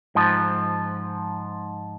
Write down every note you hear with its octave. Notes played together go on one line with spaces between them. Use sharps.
G#2 F3